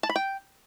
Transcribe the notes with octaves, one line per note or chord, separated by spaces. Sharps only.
A5
B5
G5